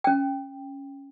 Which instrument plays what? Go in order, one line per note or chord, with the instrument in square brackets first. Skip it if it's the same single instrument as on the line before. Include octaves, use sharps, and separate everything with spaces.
[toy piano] C#4 G5